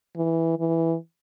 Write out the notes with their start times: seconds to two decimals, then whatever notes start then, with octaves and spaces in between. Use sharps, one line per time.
0.16 E3
0.58 E3